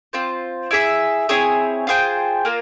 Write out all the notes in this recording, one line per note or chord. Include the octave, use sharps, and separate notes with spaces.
C4 F4 C5
E4 G#4 E5
C4 E4 G#4 C#5
F4 G#4 C5 G5
A#3 F4 A#4